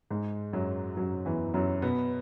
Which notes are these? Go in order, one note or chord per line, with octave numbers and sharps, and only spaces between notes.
G#2 G#3
F#2 F#3
F#2 F#3
E2 E3
F#2 F#3
B2 B3